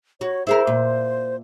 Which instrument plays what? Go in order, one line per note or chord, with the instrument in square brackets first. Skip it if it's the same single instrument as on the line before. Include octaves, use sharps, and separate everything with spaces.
[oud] F#4 [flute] C#5
[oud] E4 G#4 A#4 [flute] C5
[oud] A#2